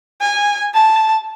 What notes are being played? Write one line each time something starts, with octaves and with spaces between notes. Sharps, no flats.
G#5
A5